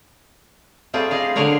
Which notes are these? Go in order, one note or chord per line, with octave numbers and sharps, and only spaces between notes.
G3 A3 C4 F4 G#4
G#4 D#5 F5
D3 A#3 G#4 A#4 C#5 F5